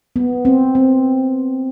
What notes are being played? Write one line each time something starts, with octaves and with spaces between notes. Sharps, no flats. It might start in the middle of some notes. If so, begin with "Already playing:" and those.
B3
C4
C4